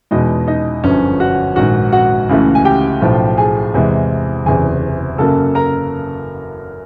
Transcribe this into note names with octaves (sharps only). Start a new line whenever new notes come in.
E2 B2 G#3 D#4 D#5
D#4 D#5
G1 F#2 D3 F3 C#4 C#5
F#4 F#5
A#1 G#2 D#3 F#4 F#5
F#4 F#5
C#2 C#3 E3 A3
G#5
G4 G5
B1 A2 F3
G#4 G#5
E2 C3 E3 G#3
F#1 E2 C3 G#4 G#5
F#2 C#3 F#3 A#3 A4 A5
A#4 A#5